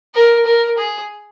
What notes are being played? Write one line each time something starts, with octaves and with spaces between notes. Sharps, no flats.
A#4
A#4
G#4